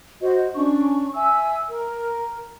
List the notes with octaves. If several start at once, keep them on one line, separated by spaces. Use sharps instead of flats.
F#4 C5 D#5
C#4 D4 C#6
E5 G#5 E6
A#4